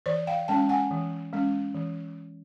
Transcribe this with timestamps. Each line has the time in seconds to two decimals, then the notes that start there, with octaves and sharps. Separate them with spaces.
0.06 E3 C5 D5
0.27 F5 G5
0.48 G#3 C#4 G5 A5
0.69 F#5 G#5
0.91 E3
1.33 G#3 C#4
1.74 E3